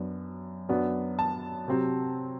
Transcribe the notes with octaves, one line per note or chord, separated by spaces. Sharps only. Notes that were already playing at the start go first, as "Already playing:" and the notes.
Already playing: F#2 F#3 B3 D4
F#2 F#3 B3 D4
A5
C3 F#3 C4